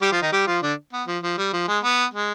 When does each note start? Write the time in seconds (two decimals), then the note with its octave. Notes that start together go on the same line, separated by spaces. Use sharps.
0.02 G3 G4
0.12 F3 F4
0.22 D#3 D#4
0.32 G3 G4
0.47 F3 F4
0.62 D3 D4
0.93 B3
1.07 F3
1.23 F3
1.38 G3
1.53 F3
1.68 G#3
1.83 B3
2.14 G#3